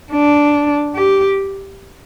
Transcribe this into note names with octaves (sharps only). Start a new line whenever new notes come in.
D4
G4